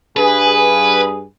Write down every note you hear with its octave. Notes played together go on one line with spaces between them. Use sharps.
G2 G#4 B4